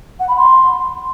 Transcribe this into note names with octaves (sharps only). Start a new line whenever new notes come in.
F#5
B5
C6